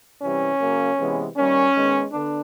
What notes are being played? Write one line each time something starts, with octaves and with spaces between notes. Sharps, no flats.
C3 E3 G3 C#4
C#3 F#3 A#3
C3 E3 G#3 B3
D#3 G3 A#3 C#4
D#3 G#3 B3
D3 B3 D4